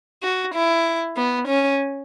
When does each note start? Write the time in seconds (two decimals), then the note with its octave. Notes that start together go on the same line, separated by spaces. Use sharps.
0.23 F#4
0.54 E4
1.17 B3
1.48 C#4